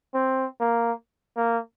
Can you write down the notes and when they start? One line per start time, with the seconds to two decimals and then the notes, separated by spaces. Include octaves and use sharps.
0.14 C4
0.60 A#3
1.37 A#3